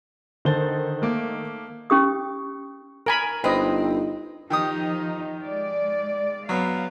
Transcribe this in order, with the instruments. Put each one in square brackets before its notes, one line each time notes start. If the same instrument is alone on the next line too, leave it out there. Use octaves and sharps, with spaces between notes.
[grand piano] D3 C5 G7 [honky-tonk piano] D#3 A6
[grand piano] A3 A#3 D6
[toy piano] C#4 G4 D#6
[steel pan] A#4 G#5 B5
[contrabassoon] G1 [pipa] C4 [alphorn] D#4 [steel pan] B4 D#5
[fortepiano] D#3 G4 D#6 [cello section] F3 D#4
[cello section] G#3 D5
[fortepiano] F#3 B3 [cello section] F5